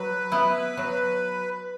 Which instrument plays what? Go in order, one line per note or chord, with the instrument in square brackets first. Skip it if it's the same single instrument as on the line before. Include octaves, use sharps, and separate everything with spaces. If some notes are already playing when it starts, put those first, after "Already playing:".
Already playing: [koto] F#3 [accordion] B4
[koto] B3 E4
F#3